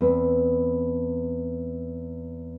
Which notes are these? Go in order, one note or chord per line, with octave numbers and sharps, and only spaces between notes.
E2 C4 B4